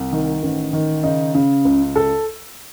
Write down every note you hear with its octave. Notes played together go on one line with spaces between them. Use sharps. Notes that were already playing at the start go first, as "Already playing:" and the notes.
Already playing: C2
D#3
A1
D#3
C#3 D#4
C#3
C#2
A4